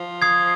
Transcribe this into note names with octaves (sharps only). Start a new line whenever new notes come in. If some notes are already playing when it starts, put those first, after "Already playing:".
Already playing: F3
D#6 G#6 C7